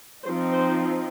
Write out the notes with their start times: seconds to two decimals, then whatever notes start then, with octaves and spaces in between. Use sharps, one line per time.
0.24 F3 C4 D#4 C5
0.52 C5